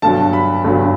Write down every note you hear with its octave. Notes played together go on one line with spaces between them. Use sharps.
G1 G2 F#3 A5
B5
G1 G2 F#3